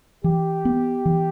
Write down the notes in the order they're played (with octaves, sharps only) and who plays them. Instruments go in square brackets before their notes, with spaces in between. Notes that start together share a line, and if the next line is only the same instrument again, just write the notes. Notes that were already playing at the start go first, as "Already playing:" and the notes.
[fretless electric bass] E3 [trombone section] G4
[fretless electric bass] B3
E3